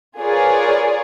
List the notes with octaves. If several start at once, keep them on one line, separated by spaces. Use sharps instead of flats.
F4 G#4 A#4 B4 C#5 D5